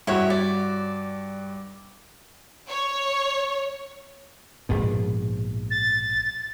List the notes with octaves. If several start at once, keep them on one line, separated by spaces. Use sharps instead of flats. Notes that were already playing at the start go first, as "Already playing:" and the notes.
G2 E4 F#4 C#5 E5
D5
C#5
A#1 G#2 B2
A6